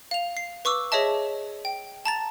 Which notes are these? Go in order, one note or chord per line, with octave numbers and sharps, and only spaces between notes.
F5 F7
C7
B4 C#6 D6 E6
G#4 C#5 D#5 E5 A5
G5
A5 A#5 A6